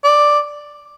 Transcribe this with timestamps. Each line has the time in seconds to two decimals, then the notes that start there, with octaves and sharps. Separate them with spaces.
0.04 D5